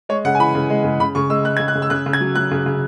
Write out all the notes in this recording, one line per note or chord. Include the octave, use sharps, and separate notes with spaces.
G#3 C#5
C#3 F#5
G#5
E3 B5
C#3
G#3
C#3
C#3 B5
C#3 C#6
G#3 E6
G#3 F#6
G#6
C#3
F#6
C#3
E6
C#3 F#6
C#3
G#6
F#3
F#3 F#6
C#3
C#3